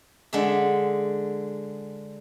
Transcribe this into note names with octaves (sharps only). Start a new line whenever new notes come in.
D3 G#3 E5